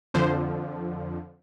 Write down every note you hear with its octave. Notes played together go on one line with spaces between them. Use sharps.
F2 D3 F3 C5